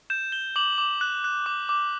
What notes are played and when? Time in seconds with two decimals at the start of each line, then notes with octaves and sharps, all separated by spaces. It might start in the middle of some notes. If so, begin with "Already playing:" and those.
0.10 G6 E7
0.32 G6 G7
0.56 D6 F#7
0.78 D6
1.01 F#6
1.24 F#6
1.46 D6
1.69 D6